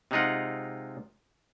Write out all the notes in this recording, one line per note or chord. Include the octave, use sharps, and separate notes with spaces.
C3 G#3 D#4 F4 F#5